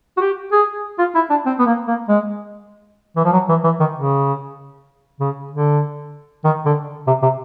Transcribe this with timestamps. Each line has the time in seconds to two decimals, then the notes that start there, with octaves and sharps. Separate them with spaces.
0.17 F#4
0.21 G4
0.52 G#4
0.99 F4
1.15 E4
1.30 D4
1.46 C4
1.59 B3
1.66 A#3
1.88 A#3
2.08 G#3
3.16 E3
3.25 F3
3.33 F#3
3.49 E3
3.64 E3
3.80 D#3
3.95 C#3
5.20 C#3
5.51 D3
6.44 D#3
6.65 D3
7.07 C3
7.22 C3